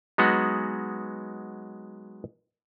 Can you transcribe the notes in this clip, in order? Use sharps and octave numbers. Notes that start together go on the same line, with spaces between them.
F#3 G#3 B3 D#4 F#4